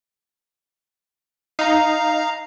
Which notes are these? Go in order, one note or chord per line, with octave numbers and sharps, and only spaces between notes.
D#4 F5 A#5